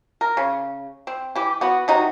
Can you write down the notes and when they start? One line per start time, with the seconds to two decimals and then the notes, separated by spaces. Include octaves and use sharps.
0.21 A#4
0.37 C#3
1.07 C4
1.35 E3 G4
1.61 B3 F#4
1.88 C3 D#4 F#4